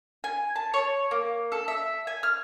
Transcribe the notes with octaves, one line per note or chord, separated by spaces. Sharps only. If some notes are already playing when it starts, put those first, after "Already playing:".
G#5
A5
C#5
A#3
A4
E5
G#5
F6